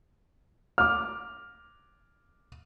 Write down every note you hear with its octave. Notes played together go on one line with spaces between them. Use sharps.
D6 F6